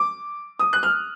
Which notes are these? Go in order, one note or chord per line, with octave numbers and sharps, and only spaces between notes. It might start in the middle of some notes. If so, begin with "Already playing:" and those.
Already playing: D6
D#6
F#6
F6